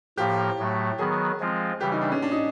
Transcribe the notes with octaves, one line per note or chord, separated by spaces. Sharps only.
A2 F3 A#3 G4
A2 F#3 A3
D#3 F#3 B3 G#4
F3 G#3 C4 F4
C#3 E3 G3 G4
D#4
D4
C#4
D4
D#4